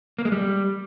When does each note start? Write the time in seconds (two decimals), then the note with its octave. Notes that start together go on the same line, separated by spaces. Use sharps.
0.18 A#3
0.25 G#3
0.32 G3